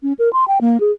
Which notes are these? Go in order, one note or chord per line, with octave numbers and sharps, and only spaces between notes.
C#4
A#4
C6
G5
A#3
G#4